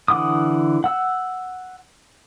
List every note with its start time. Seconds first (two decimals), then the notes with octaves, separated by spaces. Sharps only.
0.08 D3 E3 F#5 D6 D#6
0.84 F#5 E6